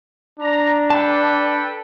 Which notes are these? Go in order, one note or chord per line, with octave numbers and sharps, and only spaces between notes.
D4 A#5
A4 B4 G5 A5